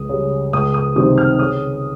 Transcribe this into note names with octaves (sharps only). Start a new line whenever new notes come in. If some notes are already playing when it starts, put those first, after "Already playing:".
Already playing: C#2 D#6
C#3 G3
C#2 D#6
D#6
C3 D#3 G3 C4 D#6
F6
C#3 D#6